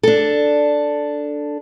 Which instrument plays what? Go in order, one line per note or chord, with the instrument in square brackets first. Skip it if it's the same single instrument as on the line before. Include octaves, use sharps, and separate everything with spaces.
[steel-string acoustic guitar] D4 A4